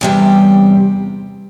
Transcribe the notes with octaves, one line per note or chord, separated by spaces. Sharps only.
E2 C3 G3